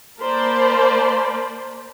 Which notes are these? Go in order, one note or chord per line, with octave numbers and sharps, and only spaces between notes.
A#3 A#4 C5 D5 A5 B5